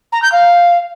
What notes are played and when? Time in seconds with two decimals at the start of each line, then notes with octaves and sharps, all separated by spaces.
0.12 A#5
0.22 G6
0.32 F5